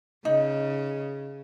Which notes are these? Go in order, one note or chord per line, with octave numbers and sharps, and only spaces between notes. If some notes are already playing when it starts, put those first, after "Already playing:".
C#3 D#4